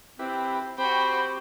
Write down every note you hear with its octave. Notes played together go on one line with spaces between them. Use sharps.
C4 E4 G4 B4
C4 F#4 G4 C5 G5 B5